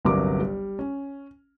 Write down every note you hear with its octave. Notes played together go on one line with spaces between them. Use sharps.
G1 C2 F#3 C#4 A#4 D6
G3
C#4